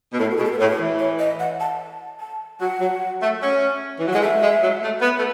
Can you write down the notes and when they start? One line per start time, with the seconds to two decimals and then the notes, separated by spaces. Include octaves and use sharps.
0.12 B2
0.19 A2 A4
0.31 F#4
0.37 B2 G#4
0.44 A4
0.52 B4
0.59 A2 C#5
0.80 E3
0.99 C#5
1.19 D#5
1.40 F#5
1.60 A5
2.20 A5
2.61 F#3 F#5
2.80 F#3
3.21 A3
3.41 C#4
3.99 E3
4.06 F#3
4.13 G#3 F#5
4.22 A3 E5
4.42 G#3
4.62 F#3
4.82 A3
5.01 B3
5.18 A3